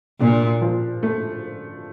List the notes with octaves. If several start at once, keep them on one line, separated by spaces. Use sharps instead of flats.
A#2 D4
F3
A3